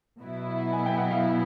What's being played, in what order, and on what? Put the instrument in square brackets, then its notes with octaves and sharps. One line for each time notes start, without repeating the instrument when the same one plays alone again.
[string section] B2 F#3 B3 E4
[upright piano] G#5
G5
F#5
F5